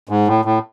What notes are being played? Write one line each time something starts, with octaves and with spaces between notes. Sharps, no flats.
G#2
A2
A2